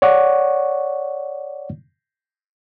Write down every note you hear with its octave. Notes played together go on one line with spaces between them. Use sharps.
C#5 D5 F#5 C#6 D6